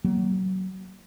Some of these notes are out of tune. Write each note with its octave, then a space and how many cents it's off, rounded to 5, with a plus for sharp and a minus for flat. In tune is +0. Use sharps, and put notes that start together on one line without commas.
F#3 +25 A#3 -5